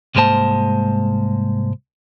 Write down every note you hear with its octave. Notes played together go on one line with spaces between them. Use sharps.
C2 G#2 G#3 A#3 C5 A5